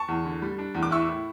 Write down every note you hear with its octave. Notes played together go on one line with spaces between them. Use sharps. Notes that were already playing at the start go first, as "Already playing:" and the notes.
Already playing: A5 C#6
E2
D3
G3
D4
E2
D6
E4 C#6 E6
A2